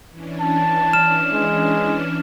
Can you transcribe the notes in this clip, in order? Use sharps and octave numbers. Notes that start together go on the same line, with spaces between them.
E3 C#4 D4
A5
F6 E7
G#3